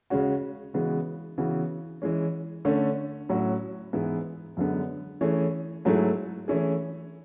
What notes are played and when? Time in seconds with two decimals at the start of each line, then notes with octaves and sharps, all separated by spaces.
0.10 C#3 G#3 C#4 F#4
0.74 C#3 E3 G#3 B3 F#4
1.38 C#3 E3 B3 F#4
2.02 E3 G#3 C#4
2.65 D3 A3 C#4
3.29 A2 F#3 C#4 F#4
3.93 G#2 E3 B3 E4 G#4
4.57 F#2 D3 G#3 B3
5.21 E3 A3 C#4 G#4
5.85 G#2 F#3 A3 E4 G#4
6.48 E3 A3 C#4 E4 G#4